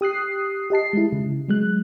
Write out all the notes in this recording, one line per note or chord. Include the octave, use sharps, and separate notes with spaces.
G4 D#6 F#6 C7
G4 D#5 A5 C7
G#3 E4
C#3
F#3 G#3 F#6